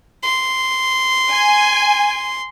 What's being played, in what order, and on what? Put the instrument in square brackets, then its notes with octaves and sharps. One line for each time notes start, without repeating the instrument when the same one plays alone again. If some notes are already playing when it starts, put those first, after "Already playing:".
[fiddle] C6
[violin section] G#5